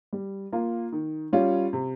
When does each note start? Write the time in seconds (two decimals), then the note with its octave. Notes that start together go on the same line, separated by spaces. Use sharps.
0.13 G3
0.53 A#3 F4
0.92 D#3
1.33 G3 C#4 F4
1.73 C3